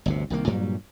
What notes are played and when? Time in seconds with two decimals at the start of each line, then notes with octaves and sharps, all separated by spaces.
0.06 G1 D2 C3
0.30 C2 D#3 A#3
0.47 G2 A#2 F#3 G3